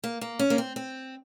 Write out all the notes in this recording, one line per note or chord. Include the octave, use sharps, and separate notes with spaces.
A#3
A#3
C#4
A#3
C4
C4